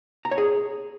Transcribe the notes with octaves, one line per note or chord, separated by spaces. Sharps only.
A#5
C#5
G#4